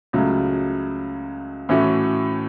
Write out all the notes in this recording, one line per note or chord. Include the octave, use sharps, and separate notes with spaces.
C#2 C#3 F#3 A3
A2 E3 A3 C#4 F#4